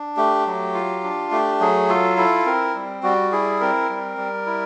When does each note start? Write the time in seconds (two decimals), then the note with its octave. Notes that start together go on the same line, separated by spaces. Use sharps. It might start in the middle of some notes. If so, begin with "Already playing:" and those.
Already playing: D4
0.17 A3 G4
0.46 F#3
0.74 F4
1.04 D4
1.31 A3 G4
1.61 F#3 G#4
1.89 F4 A4
2.17 E4 A4
2.46 C4 A#4
2.75 G3
3.03 G3 F#4
3.32 E4 G#4
3.61 C4 A#4
3.89 G3
4.17 G3
4.46 E4